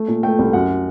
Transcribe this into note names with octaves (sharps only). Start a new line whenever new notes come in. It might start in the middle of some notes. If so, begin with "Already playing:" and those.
Already playing: A3
A#2
A3 G5
C2
F#2 F#5